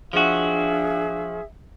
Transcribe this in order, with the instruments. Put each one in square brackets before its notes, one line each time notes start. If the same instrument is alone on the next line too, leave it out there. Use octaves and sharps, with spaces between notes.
[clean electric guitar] F3 F#4 [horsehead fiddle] D4 F5 [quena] G#4 [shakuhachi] E5